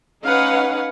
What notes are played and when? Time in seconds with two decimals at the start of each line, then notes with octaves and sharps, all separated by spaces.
0.24 C#4 D#4 B4 F5 F#5